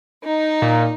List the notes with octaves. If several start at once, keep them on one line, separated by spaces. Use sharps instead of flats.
D#4
A#2